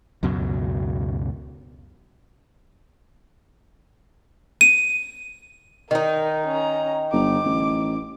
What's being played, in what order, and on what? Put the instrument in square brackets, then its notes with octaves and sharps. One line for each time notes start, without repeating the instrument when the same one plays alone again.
[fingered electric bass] C#2 F#2 B2 F#3
[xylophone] D#7
[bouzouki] D#3 D#4 [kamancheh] A#4
[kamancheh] C#4 A#5
[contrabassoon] G1 [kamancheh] D6
[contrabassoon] A1